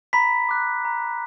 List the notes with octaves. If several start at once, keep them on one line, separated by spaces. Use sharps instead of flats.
A#5 B5 B6
D6 F#6
A#5